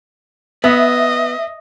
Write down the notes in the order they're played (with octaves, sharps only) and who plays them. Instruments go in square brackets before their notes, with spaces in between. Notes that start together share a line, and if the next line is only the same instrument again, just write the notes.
[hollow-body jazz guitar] B3 [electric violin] D#5 [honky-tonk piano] E5